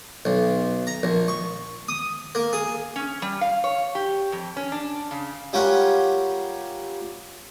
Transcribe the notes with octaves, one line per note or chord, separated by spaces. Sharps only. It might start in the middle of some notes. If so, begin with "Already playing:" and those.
B1
A#5
A#1
C#6
D#6
A#3
G#4
C#4
G3
F5
C#5
G4
F2
C#4
D4
C#3
G3 C#4 F4 A#4 C#5 F#5